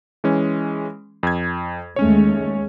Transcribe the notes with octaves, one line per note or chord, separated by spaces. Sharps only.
E3 G#3 C#4
F2 G#6
D#2 G#3 A3 C#4 C#5